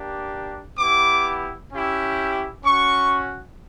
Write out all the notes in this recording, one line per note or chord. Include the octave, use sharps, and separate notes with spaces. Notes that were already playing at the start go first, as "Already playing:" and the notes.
Already playing: A#3 D4 G4
B3 E4 G4 D6
C#4 E4 G4
C#4 F#4 C#6